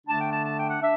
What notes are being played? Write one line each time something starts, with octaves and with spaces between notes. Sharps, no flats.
D3 A3 D4 A5
G5
A5
A5
G5
F#5
D4 E5